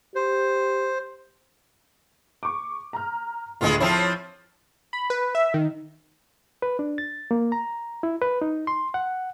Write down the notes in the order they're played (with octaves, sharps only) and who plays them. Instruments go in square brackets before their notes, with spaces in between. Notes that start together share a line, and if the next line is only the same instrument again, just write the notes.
[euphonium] G4 [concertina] C5
[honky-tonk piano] C#6 D6
A#5 F6
[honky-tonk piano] D2 A2 [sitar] G#3 B3 F4
[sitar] F3 C4 E4 [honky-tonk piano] C#5 C7
[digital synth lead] B5
B4
E5
D#3
[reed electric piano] B4
D4
A6
A#3
A#5
E4
B4
D#4
C6
F#5